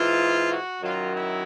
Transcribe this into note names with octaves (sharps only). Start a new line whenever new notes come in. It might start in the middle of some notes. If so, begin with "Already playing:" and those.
Already playing: G#2 E3 F4
F#4
F#2 D#3 F#3 F4
E4